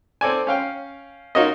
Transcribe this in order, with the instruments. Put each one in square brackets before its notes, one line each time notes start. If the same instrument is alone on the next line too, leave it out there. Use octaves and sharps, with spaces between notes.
[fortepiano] C4 A4 D5 G#5
C#4 F5 G5
D#4 F4 F#4 A#4 C#5 D#5